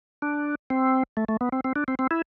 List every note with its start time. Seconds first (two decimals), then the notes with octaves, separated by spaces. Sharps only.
0.22 D4
0.70 C4
1.17 A3
1.28 A3
1.41 B3
1.52 C4
1.64 C4
1.76 D4
1.88 C4
1.99 C4
2.11 E4